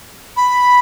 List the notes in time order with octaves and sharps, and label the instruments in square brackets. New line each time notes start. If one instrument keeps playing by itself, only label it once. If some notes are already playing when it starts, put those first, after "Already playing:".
[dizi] B5